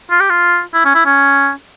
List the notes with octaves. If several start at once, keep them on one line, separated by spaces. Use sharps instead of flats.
F4
G4
F4
E4
C#4
E4
C#4